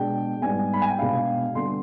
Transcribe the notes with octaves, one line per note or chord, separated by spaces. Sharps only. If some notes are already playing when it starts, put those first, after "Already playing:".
Already playing: B2 G#3 D4 G5
G#2 G3 B3 G#5
B5
G#5
G5
B2 G#3 D4 F5
D3 G3 B3 C6